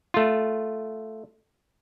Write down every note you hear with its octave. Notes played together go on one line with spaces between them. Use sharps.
A3 F4